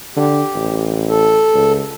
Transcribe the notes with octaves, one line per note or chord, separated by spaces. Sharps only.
D3 G4
A1
A4
C#2